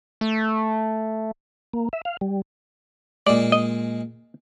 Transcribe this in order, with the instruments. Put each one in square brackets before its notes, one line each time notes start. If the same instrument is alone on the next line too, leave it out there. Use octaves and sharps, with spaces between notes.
[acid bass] A3
[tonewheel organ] A#3
E5
F5
G3
[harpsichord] A#2 G#3 [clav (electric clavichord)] D5
[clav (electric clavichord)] D#5